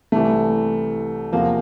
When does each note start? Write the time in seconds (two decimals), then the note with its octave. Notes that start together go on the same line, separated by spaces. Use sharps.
0.12 C2 C3 E3 A3
1.32 E2 C3 F3 A#3